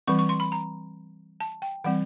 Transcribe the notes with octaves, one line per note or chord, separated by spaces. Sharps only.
E3 G3 C4 C#6
C#6
C6
B5
A#5
A5
G5
E3 G3 C4 F#5